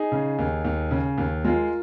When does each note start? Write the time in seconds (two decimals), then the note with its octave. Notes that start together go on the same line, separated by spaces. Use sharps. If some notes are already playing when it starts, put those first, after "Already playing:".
Already playing: D#4 G#4
0.12 C#3
0.39 D#2
0.65 D#2
0.91 C#3
1.18 D#2
1.45 G#3 F4 A#4